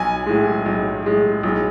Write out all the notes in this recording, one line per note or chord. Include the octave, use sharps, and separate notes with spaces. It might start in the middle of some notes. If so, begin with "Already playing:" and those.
Already playing: B1 G#5
A2 G#3
B1
A2 G#3
B1